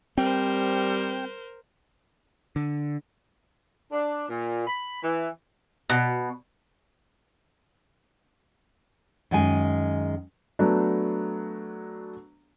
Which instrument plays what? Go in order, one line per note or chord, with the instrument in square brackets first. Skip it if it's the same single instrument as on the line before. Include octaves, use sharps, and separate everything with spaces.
[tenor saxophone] G3 [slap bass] C4 [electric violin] A#4 C5 [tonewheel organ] G5
[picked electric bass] D3
[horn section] D4
A#2
B5
E3
[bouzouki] B2
[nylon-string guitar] F#2 D#3 G#3 G#5
[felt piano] F#3 A3 B3 D4